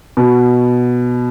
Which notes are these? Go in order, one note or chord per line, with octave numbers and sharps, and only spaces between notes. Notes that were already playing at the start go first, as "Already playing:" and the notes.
B2